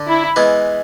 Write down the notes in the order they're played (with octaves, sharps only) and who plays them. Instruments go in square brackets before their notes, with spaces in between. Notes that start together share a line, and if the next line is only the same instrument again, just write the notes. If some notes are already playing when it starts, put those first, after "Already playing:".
Already playing: [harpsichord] D3
[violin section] E4
[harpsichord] E3 G#3 B3 E4